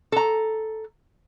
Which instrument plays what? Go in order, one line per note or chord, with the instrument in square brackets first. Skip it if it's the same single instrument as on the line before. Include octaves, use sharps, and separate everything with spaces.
[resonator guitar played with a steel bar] A4 A#5